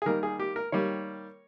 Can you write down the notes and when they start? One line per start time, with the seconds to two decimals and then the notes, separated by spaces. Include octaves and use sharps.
0.02 G#4
0.06 D#3 G3 A#3 A#4
0.23 G#4
0.39 G4
0.56 A#4
0.72 D#3 G3 A#3 C#5